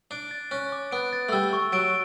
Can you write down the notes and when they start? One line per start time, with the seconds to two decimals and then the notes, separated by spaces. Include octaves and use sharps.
0.11 D4 D7
0.31 A6
0.51 C#4 F#6
0.72 D6
0.91 B3 D7
1.13 A6
1.29 A3
1.32 G3 E6
1.53 C#6
1.73 F#3 D7